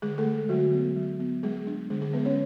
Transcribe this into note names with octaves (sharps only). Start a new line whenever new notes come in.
D3 G#3 G#4
A3 A4
G#3
D3 F#3 F#4
B3
F#3
B3
F#3 G#3 G#4
D4
D3 G#3 G#4
G#3 G#4
F#3 B3 B4
C#4 C#5